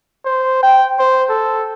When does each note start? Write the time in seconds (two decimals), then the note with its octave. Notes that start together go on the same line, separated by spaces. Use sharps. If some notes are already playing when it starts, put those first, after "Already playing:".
0.25 C5
0.63 G5
0.99 C5
1.29 A4